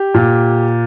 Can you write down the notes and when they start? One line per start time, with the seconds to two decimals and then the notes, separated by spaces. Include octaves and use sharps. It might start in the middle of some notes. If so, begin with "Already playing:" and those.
Already playing: G4
0.14 A#2